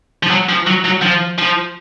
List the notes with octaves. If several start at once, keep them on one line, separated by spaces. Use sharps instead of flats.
F3
F#3
F3
F#3
F#3
F3
F3